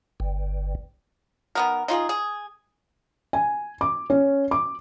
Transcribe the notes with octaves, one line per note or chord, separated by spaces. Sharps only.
G1
D#3 B3 A#4
D#4 F4 G4 G#4
G#4
G#5
D6
C#4
D6